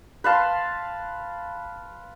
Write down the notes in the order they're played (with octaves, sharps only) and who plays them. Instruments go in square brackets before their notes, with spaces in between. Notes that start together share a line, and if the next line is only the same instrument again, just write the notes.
[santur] B4 F5 A5 C6